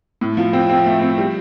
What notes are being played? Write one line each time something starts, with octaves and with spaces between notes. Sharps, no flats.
A2
F3
C4
C4
A3
C4
G3